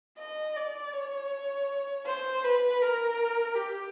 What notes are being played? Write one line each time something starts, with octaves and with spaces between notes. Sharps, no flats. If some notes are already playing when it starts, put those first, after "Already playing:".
D#5
D5
C#5
C5
B4
A#4
G4